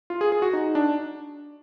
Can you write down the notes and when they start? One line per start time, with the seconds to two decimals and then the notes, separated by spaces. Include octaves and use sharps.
0.10 F4
0.21 G#4
0.32 G#4
0.42 F#4
0.53 D#4
0.75 D4